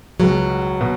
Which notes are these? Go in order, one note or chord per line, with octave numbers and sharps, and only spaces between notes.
C#2 B2 F#3 G#3 B3
B2